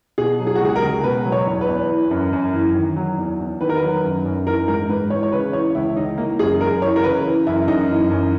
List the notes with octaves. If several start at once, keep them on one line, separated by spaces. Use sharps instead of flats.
B2 G#4
F#3
G#4
F#4
C#2 G#4
A#4
C#2
B2 B4
F#3
C#5
E2
B4
E2
E3
F#2
F#2
E3
D#3
F#3
E2
E2
D#3 B4
A#4
B4
F#3
F#2
F#2
E3 A#4
G#2 A#4
G#2 B4
E3 C#5
C#5
C#3 B4
E3 C#5
C#2 E4
C#2 D#4
E3 A#3
F#2 G#4
F#2 A#4
E3 C#5
A#4
C#3 B4
E3
F#2 E4
F#2 D#4
E3
F#2